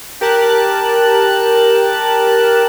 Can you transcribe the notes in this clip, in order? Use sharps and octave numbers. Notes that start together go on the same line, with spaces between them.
G4 A#4 A5 F#6